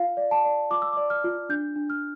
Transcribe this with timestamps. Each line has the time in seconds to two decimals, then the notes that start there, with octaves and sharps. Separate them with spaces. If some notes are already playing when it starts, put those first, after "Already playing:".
Already playing: F4 F5
0.17 D5
0.31 A5
0.45 D5
0.70 F4 D6
0.82 E6
0.92 D6
0.97 D5
1.10 F6
1.24 F4
1.49 D4 G6
1.76 D4
1.90 F6